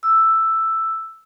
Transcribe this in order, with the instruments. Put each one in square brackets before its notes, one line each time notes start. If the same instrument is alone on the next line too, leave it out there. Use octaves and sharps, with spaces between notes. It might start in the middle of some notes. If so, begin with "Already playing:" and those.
[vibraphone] E6